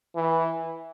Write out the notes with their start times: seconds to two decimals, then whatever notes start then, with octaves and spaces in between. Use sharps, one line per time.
0.15 E3